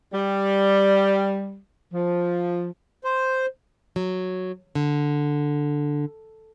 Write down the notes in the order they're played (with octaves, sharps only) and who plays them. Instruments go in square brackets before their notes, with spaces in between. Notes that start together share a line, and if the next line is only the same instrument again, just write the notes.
[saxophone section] G3
F3
[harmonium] C5
[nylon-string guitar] F#3
D3